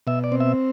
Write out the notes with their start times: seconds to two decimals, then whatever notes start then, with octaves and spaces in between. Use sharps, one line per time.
0.07 B2 E5
0.24 D5
0.32 C4
0.40 E5